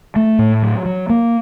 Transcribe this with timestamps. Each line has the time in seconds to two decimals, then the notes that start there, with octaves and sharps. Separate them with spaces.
0.16 A3
0.39 A2
0.62 F#3
0.85 F#3
1.10 A#3